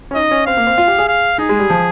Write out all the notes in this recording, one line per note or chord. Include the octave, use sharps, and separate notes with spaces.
C#4
D#4 D#5
C#4
C4 F5
A#3
C4
F4
G4
G#4
F5
D#4 G#4
G#3
G3
F3